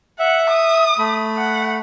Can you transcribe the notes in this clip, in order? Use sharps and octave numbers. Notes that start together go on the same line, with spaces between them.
E5 F#5
D#6
A3 B5
F#5